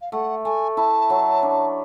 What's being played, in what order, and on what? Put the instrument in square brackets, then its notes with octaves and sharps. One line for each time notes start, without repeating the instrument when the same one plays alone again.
[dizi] F5
[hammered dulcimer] A3 [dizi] F#5
[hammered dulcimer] A3 [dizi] G#5
[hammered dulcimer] E4 [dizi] A5
[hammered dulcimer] F#3
D4